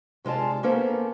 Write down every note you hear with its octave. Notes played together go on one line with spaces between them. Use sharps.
C3 G#3 F4 D5 A5
A#3 B3 C#4 A4 A#4 C5